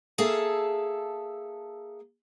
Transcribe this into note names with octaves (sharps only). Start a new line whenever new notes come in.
A#3 G#4 A4 E5 F5 A5